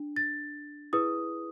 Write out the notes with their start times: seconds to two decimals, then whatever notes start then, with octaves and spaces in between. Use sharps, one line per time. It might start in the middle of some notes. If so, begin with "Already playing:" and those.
Already playing: D4
0.16 A6
0.93 E4 G#4 B4 D#6